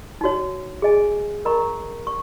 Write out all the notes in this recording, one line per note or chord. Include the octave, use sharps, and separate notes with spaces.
D#4 F#4 C#5
G#4 D#5 G#5
A#4 D#5 A#5 C#6
C#6